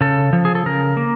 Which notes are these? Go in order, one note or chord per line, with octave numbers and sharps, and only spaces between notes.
C#3 A4
F3
G#4
A4
C#3 A#4
A#3